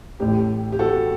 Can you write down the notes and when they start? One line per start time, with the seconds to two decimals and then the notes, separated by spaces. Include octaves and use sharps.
0.20 A1 A2 G4
0.72 G4
0.79 F#4 A4